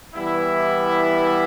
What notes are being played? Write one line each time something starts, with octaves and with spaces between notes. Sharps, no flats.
E3 G3 B3 E4